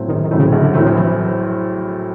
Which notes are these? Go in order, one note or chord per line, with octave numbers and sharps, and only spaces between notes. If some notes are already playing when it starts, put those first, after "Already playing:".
Already playing: A2 F#3 A3 C4
A#1 D#3
D#3
A2 F#3 A3 C4
C#3
A#1 D3
D3
A2 E3 F#3 A3 C4
F3
E3